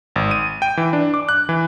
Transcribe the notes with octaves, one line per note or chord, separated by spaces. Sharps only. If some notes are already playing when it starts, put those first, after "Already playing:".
G#1
D#7
G5
E3
D4
D6
F#6
E3